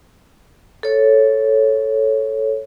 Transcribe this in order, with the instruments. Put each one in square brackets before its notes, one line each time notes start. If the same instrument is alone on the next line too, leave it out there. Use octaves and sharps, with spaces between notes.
[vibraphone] A4 C#5